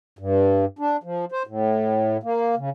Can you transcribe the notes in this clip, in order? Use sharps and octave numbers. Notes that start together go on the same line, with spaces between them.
G2
D4
F3
C5
A2
A#3
C#3